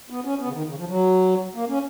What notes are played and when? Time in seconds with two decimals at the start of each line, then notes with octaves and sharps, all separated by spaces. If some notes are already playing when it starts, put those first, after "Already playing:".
0.10 B3
0.25 C#4
0.39 B3
0.46 C#3
0.53 D#3
0.68 C#3
0.78 F3
0.87 F#3
1.55 A#3
1.69 C#4